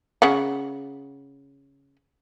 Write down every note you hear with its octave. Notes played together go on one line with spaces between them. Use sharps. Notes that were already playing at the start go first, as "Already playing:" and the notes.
C#3 F#5